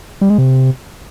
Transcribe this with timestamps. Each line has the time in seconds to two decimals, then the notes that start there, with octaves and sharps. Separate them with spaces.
0.21 G3
0.30 G#3
0.38 C3